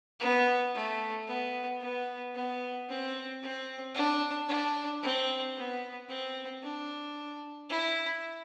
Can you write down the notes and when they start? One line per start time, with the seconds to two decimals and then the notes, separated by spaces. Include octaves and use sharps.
0.20 B3
0.74 A3
1.27 B3
1.81 B3
2.35 B3
2.89 C4
3.42 C4
3.95 D4
4.48 D4
5.03 C4
5.56 B3
6.09 C4
6.63 D4
7.70 E4